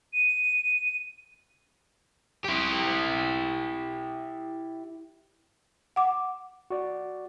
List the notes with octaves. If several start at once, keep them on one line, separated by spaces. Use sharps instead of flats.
D#7
E4 G4
F#5 D6
F#4 D5